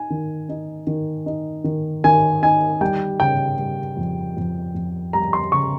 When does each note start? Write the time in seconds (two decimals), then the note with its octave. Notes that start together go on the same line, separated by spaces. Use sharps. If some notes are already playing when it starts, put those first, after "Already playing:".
Already playing: D#4 G#5
0.10 D#3
0.49 D#4
0.87 D#3
1.26 D#4
1.64 D#3
2.04 D#3 G#5
2.42 D#4 G#5
2.81 G3 G5
3.20 C#3 G5
3.58 G3
3.97 F2
4.37 F2
4.75 F2
5.13 G3 A#5
5.33 C6
5.52 C#3 C#6